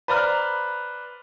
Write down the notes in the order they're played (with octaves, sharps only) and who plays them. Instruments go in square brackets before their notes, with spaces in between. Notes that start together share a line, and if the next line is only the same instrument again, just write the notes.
[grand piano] B4 C5 D5 A#5 B5 F6